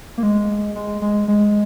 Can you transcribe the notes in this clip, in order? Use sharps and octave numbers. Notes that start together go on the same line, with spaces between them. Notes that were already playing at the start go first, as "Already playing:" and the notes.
A#3
G#3
G#3
G#3
G#3